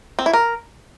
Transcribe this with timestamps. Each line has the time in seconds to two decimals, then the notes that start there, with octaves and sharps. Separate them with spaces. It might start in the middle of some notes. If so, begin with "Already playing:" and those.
0.19 C4
0.26 E4
0.33 A#4